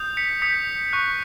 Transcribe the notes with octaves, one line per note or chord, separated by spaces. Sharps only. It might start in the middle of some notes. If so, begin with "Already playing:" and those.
Already playing: D#6 G6
B6 C#7
D#6 G6 B6 C#7
C#6 F#6